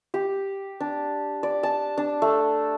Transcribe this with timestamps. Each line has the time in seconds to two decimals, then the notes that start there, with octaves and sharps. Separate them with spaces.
0.14 G4
0.80 D4
1.43 D5
1.63 A5
1.98 D4
2.22 A3